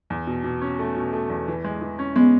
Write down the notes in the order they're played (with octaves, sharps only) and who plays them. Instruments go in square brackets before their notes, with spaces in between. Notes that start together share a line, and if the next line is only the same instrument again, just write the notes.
[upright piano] E2
B2
B2
C#4
A3
B2
A3
E2
E3
G#3
E3
C#4
[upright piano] G#3 [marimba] B3